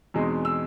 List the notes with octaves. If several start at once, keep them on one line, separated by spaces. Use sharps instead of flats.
E2 B2 G#3 C4 D#4
E6